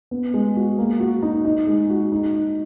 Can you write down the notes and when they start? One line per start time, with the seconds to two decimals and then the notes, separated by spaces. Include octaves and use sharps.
0.11 B3
0.34 G#3
0.56 F#4
0.78 A#3
1.00 F#4
1.23 D#4
1.45 D#4
1.67 G#3
1.90 F#4
2.12 D#4